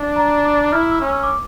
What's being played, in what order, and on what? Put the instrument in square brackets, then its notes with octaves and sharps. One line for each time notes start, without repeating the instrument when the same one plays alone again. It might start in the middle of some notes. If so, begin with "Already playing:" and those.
Already playing: [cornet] D4
[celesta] A#5
D6
[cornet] E4 [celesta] F6
[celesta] E6
[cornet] C#4
[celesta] E6
D6